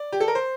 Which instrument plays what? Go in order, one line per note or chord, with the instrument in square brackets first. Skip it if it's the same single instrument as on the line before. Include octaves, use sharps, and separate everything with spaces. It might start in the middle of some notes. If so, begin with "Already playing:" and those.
Already playing: [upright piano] D5
G4
A4
A#4
C5